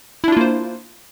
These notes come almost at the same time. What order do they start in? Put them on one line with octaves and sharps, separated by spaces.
E4 D4 F4 A#3 C5